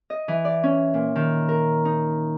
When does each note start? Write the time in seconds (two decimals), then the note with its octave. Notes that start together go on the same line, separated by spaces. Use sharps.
0.10 D#5
0.28 E3
0.45 D5
0.63 C#4
0.94 A#2
1.16 D#3
1.49 A#4
1.85 D#4